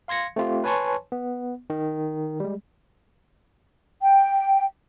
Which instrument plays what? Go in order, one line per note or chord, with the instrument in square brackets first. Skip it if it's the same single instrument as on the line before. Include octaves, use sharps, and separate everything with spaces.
[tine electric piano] F5 C6 G#6 A#6 C#7
A3 C4 F4 G4
B4 C#5 G#5 A5 C6 C#6
B3
D#3
G3 G#3
[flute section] G5